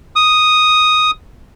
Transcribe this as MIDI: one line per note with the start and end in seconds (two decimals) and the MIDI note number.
0.16 1.11 87